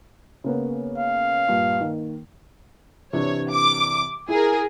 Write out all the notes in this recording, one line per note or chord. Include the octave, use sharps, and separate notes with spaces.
C#3 A#3 B3
F5
G2 A#2
D#3 A#3
C3 E3 D4 C#5
D6
E4 G#4 A#4